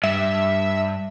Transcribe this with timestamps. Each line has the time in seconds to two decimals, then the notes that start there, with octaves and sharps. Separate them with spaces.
0.04 G2 E5